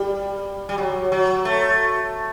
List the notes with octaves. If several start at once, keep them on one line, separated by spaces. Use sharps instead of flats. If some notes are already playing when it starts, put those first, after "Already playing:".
Already playing: G3
G3
F#3
F#3
A3